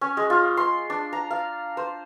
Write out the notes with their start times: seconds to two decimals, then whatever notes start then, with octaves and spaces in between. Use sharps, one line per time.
0.01 C#4
0.17 G#3
0.30 F4
0.57 C6
0.90 D4
1.13 A#5
1.31 F5
1.77 C5